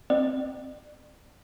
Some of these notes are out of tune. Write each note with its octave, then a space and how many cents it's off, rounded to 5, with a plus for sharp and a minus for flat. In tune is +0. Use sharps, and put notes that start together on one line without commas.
C4 +0 D5 +35